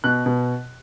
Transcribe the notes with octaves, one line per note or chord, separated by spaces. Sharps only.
B2 F#6
B2